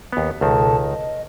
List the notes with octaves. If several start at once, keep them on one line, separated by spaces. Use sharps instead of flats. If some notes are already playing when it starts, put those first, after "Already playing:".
D#2 B3
C#2 B2 D#3 A4 A5
D#5